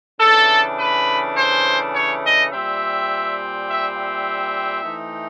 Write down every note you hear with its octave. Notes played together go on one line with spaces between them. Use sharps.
C#3 E3 A3 D4 A4
B4
C5
C#5
D#5
A#2 G3 C4 E5
E5
E5
E3 A3 C4 D#4